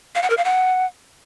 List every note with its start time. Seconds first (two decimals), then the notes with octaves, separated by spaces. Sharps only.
0.15 F5
0.23 F#5
0.30 A#4
0.37 F5
0.45 F#5